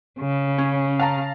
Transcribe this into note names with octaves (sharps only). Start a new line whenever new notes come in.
C#3
C#4
F5 A5 A#5